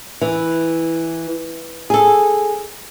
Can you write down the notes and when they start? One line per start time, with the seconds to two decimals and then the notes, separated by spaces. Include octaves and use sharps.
0.22 E3
1.90 G#4 A4